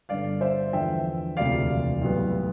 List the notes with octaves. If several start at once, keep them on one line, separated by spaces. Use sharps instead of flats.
G1 G2 D3 D5 F5
C5 E5
E2 D3 F3 E5 G5
E1 D2 C3 F3 D5 F5
B1 A2 G3 B3